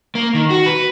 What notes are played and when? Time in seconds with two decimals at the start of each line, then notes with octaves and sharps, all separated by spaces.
0.15 A#3
0.35 D#3
0.50 F#4
0.66 B4